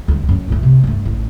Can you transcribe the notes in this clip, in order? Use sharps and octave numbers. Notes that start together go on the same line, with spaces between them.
D2 G3
F#2
A2 A3
C3
G2 A3
A1